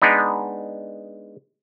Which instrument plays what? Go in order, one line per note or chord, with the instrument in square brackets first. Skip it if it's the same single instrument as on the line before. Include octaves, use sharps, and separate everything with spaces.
[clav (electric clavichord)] G#3 B3 D4 D#4